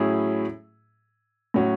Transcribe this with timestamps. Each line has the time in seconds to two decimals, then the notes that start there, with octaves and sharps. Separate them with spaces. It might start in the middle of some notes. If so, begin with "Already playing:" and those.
Already playing: A2 F#3 C#4 E4 G#4
1.54 A2 F#3 C#4 F#4